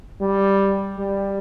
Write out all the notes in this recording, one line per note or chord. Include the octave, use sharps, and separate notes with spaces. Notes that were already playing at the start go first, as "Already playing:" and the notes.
G3
G3